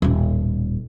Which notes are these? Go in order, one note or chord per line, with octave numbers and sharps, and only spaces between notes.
D#1 A1